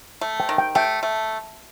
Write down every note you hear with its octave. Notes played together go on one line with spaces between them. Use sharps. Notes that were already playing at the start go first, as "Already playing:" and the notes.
A3
G5
D#3
G5
A3 G5
A3